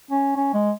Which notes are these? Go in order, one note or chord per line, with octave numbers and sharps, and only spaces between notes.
C#4
C#4
G#3